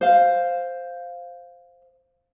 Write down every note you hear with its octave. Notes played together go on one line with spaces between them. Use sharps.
C5 F5